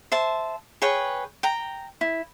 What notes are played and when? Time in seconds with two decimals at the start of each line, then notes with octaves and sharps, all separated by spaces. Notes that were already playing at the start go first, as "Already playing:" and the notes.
0.12 C5 E5 A5
0.82 G#4 B4 C#5 G5
1.43 G5 A#5
2.01 E4